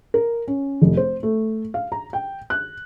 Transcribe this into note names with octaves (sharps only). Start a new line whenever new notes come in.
A#4
C#4
F1
C5
A3
F5
A#5
G5
F#6